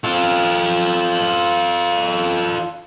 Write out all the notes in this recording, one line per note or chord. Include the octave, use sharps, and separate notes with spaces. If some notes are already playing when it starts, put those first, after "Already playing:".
F4 A4